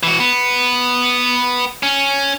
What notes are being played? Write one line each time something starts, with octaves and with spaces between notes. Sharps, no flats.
E3 F#4
B3
C#4